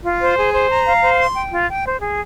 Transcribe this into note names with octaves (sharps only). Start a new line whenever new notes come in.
F4
C5
G#4
C5
A#5
F5
C5
C6
G5
F4
G5
C5
G#4